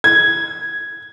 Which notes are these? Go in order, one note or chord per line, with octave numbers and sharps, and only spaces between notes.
G#6